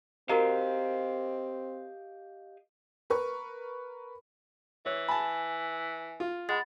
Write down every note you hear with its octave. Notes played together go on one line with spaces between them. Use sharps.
C4 F#4 G4 A#4 D#5 F5 A#5
A#4 B4 C#6
E3 C#5
G#5 A5 B5
F4
G#3 F#5 B5 A6